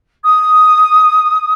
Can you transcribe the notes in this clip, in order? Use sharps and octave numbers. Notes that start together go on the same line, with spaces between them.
D#6